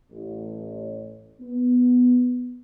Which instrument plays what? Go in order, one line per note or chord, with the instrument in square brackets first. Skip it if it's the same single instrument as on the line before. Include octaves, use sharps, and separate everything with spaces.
[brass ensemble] A1
B3